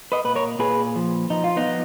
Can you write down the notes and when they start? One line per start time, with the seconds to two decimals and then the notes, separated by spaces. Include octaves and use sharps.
0.12 B4 D#5
0.24 A#2 B4
0.36 A#4 C#5
0.59 A#2 G#4 B4
0.96 F3
1.30 F3 D#4
1.44 F4
1.56 B3 D#4
1.67 F3